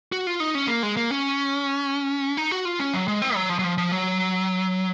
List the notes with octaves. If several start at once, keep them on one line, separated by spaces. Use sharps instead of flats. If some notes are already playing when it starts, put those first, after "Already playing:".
F#4
F4
D#4
C#4
A#3
G#3
A#3
C#4
D#4
F#4
F4
C#4
F#3
G#3
C4
F#3
F3
F#3
F3
F3
F#3